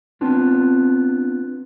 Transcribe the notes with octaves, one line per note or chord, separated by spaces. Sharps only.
B3 C4 D4 F4